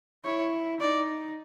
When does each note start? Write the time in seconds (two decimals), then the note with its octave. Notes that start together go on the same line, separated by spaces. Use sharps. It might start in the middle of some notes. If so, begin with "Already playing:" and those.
0.25 E4 C#5
0.80 D#4 D5